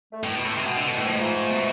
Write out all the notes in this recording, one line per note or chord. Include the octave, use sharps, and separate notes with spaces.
A3
A2 E3 G#3
B2
A2
C3
B2
D3
B2 D3
A2 E3
F3
A2 G#3
G#2 F3 A3
B2